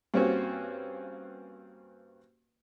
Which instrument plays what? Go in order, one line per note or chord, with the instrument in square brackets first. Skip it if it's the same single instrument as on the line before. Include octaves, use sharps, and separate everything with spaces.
[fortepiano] G2 A#3 C4 C#4 F#4